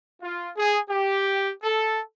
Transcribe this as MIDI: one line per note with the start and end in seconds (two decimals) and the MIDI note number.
0.22 0.50 65
0.57 0.79 68
0.89 1.51 67
1.63 2.00 69